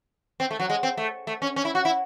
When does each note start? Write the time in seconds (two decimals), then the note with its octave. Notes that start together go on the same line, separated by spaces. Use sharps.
0.40 C4
0.51 A3
0.60 F#3
0.70 G#3
0.83 C4
0.98 A3
1.27 A3
1.42 C#4
1.56 C#4
1.65 E4
1.75 F#4
1.85 E4